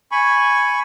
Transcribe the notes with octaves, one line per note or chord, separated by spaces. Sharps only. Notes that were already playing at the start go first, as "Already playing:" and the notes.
G#5 B5 C#6